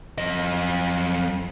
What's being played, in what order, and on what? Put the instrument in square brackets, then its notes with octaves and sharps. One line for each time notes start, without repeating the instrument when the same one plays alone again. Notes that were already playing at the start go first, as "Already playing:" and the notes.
[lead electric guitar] F2 D#5